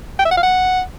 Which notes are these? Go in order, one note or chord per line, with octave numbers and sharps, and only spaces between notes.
G5
E5
F#5
F5
F#5